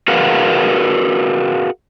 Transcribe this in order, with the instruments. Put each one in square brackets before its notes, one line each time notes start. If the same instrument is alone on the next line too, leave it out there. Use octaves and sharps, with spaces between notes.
[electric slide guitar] F#4 G#4 A#4 B4 F5 F#5